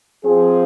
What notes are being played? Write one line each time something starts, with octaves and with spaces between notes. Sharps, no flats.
F3 C4 G#4